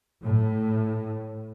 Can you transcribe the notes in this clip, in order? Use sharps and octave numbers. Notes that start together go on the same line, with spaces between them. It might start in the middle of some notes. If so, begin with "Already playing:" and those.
A2